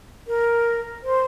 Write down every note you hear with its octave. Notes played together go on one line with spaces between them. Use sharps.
A#4
C5